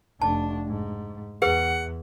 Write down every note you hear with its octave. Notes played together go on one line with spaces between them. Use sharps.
F1 D4 A5
G#2
E2 G#4 B4 F#5